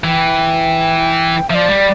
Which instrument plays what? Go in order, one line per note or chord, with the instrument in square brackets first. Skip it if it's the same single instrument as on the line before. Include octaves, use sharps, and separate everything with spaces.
[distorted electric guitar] E3 [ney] G5
[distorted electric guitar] F3 [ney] D5 E5
[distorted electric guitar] G3